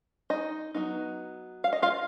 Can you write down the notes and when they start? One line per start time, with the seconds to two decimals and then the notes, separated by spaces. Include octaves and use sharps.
0.30 D#4 D#5
0.74 F#3 B3 D#4
1.64 F5
1.73 D#5
1.82 F4 F5